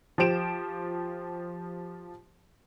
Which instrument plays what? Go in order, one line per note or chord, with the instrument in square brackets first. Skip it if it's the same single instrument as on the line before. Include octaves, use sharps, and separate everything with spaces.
[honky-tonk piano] F3 G4 C5 D7 E7